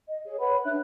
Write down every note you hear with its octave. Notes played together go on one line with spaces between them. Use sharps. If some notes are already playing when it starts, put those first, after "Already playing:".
D#5
G#4 C#5
B4 C#5 F#5 B5
D4 E5 F#6